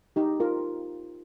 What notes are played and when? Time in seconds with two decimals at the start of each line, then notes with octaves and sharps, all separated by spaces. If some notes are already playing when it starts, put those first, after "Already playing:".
0.16 D#4 G4
0.40 F4 A#4